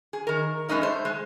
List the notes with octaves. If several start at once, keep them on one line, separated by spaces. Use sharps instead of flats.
G#4
D#3 A#4
E2 G#3 C#4 D#4 A#4
A3 C5
G#3